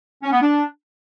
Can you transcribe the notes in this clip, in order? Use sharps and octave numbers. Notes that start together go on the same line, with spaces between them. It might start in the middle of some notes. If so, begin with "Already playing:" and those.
C#4
B3
D4